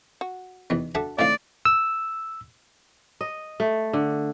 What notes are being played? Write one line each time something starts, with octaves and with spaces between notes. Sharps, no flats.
F#4
E2 B2 D#3
D4 F#4 A4 E5 A5
A2 D3 D#3 C4 D5 F5
E6
D#5
A3
D3